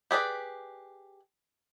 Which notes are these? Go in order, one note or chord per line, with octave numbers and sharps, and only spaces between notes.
G4 G#4 B4 D5